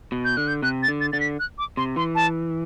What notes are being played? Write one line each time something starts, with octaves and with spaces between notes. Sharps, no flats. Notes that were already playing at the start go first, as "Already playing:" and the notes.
B2
G6
D3 F#6
G6
C3 F#6
A6
D3
A6
D3 A6
B6
F#6
D6
C3 C6
E3 C6
A5